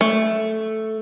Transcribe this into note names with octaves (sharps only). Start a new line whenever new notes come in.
A3